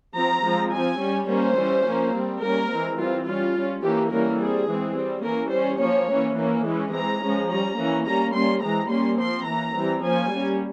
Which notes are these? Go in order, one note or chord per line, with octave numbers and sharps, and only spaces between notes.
F3 C4 A#5
F3 G#3 C4
F3 C4 G#5
G3 C#4
G3 A#3 C#4 C5
E3 G3 C#4
F3 A#3 C#4
G3 C4
G3 A#3 C#4 A#4
E3 G#3 C4
E3 G3 C4 F4
G3 C#4 F4
G3 C#4
E3 A#3 C#4 G4
E3 G3 A#3 C#4 A#4
G3 C4 G#4
E3 G#3 C4
G3 C4
E3 A#3 C#4 A#4
G3 C#4 C5
F3 A#3 C#4 C#5
E3 A#3 C#4
E3 A#3 C#4
E3 G#3 C#4
E3 G#3 C4 A#5
F3 G#3 C#4
G3 C#4 A#5
E3 A#3 C#4
G3 A#3 C#4 A#5
G3 A#3 C#4 C6
E3 G#3 C4 A#5
G3 A#3 C#4 C6
F3 C4 C6
E3 A#3 C#4 A#5
E3 G3 C4
F3 A#3 C#4 G#5
G3 A#3 C#4